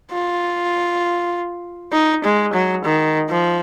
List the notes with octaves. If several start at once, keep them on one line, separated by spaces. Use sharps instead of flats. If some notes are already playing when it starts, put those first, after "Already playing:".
F4
D#4
G#3
F#3
D#3
F3